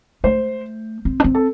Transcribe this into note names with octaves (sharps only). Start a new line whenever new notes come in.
A3 C5
C4
D4
C4
A4